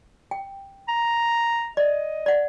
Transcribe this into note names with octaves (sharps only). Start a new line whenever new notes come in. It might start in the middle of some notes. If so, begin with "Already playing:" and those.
G5
A#5
D5 D#5
D5 F#5